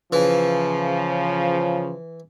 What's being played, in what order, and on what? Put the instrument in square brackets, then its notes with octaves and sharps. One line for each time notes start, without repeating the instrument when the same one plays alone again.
[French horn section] C#3 F3 [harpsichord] E3